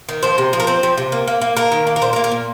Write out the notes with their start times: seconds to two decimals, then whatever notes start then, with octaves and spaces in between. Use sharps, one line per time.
0.09 D#3
0.23 F3 C5
0.38 C3
0.53 F3
0.60 A#4
0.67 C4 C5
0.83 F3
0.98 C3
1.12 A#3
1.28 A#3
1.41 A#3
1.56 A#3 A#4
1.72 D#3
1.87 A#3
1.96 A#4
2.02 A#2 C5
2.13 A#4
2.16 A#3
2.24 A#4
2.32 A#2